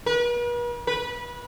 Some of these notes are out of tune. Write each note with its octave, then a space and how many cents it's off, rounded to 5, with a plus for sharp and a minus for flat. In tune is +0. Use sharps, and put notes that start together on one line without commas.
B4 -45
B4 -20